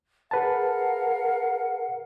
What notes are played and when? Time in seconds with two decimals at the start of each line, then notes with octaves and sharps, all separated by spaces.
0.31 G#4 A#4 B4 F5 F#5 A5